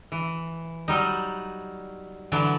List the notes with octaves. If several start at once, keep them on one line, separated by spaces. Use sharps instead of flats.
E3
F#3 G3 D#4
D3 E3 F#3 A5